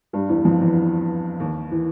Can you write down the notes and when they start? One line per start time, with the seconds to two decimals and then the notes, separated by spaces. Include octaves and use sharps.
0.13 G2 G3
0.29 E2 E3
0.45 F2 F3
0.60 E2 E3
1.40 D#2 D#3
1.72 E3